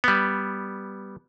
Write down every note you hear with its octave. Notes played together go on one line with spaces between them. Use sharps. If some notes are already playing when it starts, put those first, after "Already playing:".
G3 B3